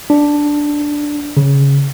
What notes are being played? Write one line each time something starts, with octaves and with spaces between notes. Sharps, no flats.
D4
C#3